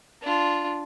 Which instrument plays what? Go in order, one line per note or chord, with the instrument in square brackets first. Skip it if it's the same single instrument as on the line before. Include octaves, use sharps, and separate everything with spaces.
[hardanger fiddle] D4 F4